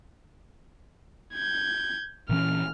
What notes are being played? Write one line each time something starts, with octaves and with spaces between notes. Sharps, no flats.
G6 G#6
A#2 E3 C#4 F6